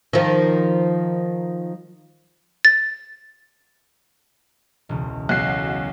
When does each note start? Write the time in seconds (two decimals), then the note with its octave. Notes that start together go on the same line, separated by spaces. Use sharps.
0.13 D#3 F3
2.65 A6
4.89 E1 C#2
5.29 B1 F#4 F#6 C7